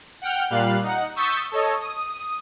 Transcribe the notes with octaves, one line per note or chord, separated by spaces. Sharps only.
F#5 G5 F6 G6
A#2 G3 F5 F#6
D#4 F#5
C#6 D#6 E6 G6 A6 B6
A4 C#5 D#5
D#6